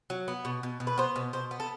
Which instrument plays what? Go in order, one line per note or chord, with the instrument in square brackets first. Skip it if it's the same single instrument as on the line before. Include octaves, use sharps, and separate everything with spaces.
[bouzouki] F#3
B3
B2
B2
B2
B4
B3 C5
B2
B2 C5
B3
A4